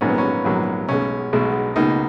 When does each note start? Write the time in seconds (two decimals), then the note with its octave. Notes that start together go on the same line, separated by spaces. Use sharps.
0.01 A#1 G#2 F#3 A#3 C#4
0.09 B3
0.18 C#4
0.45 A#1 G#2 F#3 A#3
0.89 B1 B2 G#3 C#4
1.33 B1 B2 G#3
1.76 C#2 B2 A#3 D#4